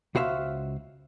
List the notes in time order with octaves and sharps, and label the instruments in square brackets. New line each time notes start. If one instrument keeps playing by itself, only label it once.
[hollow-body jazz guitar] C#2 F#4 C5 E5 F5